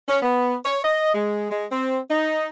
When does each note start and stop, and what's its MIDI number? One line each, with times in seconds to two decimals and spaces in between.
0.08 0.19 61
0.23 0.55 59
0.65 0.80 73
0.84 1.13 75
1.14 1.47 56
1.51 1.66 56
1.72 1.98 60
2.10 2.47 63